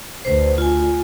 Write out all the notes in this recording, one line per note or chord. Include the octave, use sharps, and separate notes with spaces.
D2 B4 C5
F4 G#5